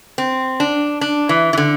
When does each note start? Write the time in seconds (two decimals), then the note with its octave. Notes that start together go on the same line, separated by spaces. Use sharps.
0.18 C4
0.60 D4
1.01 D4
1.29 E3
1.53 E3
1.58 D3